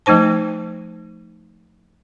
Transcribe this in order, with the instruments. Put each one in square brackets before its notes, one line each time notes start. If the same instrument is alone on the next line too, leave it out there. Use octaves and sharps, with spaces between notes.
[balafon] F3 A3 D#4 C5 A5